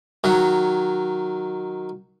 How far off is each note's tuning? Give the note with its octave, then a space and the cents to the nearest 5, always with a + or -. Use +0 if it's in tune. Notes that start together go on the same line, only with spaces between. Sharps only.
D#3 +0 F#3 +0